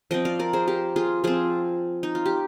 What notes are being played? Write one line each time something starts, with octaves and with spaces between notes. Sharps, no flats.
F3 C4 D#5 G5
D5 F5
A#4 D5
G#4 C5
G4 A#4
F4 G#4
F3 C4 F4 G#4
D#4
F4
G4